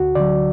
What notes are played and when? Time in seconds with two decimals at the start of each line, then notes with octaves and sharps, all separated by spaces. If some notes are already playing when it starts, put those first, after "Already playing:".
Already playing: D2 F#4
0.15 D3 F#3 D5